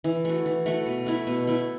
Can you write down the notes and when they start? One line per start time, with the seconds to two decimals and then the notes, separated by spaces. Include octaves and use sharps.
0.04 E3
0.25 A3 F#4
0.46 E3
0.66 A3 F#4
0.86 B2
1.06 A3 E4
1.27 B2
1.47 A3 E4